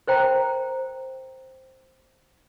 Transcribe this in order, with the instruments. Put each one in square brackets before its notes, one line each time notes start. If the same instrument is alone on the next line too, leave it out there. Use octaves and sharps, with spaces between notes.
[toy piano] A#4 C5 G5 A#5